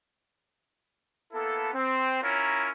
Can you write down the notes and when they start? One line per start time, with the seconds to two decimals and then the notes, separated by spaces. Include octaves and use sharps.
1.33 A#3 B3 E4 A4
1.74 C4
2.22 C#4 E4 F4 A#4 C#5 A#5